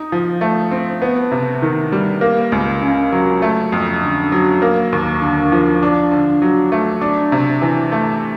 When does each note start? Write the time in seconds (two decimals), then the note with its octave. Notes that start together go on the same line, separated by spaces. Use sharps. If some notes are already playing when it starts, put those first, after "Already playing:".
Already playing: D#4
0.12 F3
0.41 A3
0.71 C4
1.02 B3
1.32 C3
1.62 D#3
1.92 G3
2.21 A#3
2.52 C#2
2.82 C#3
3.12 F#3
3.42 A3
3.72 F2
4.02 D3
4.32 F#3
4.62 A#3
4.93 D#2
5.22 D3
5.52 F3
5.83 D4
6.11 D3
6.42 F#3
6.72 A3
7.01 D4
7.32 C3
7.62 E3
7.92 A3